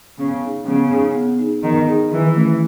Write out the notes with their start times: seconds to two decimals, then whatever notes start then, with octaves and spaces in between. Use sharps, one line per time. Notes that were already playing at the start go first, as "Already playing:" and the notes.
0.18 C#3 B3
0.42 D#4 G#4
0.67 C#3 B3
0.91 D#4 G#4
1.15 B3
1.39 D#4 G#4
1.63 D#3 B3
1.88 D#4 G#4
2.11 D#3 E3
2.36 A3 C#4 E4